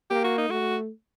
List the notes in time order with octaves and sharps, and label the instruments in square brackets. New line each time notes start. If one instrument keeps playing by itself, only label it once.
[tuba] A#3 [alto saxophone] G4
[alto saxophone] F#4
D#4
[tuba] A3 [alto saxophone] F#4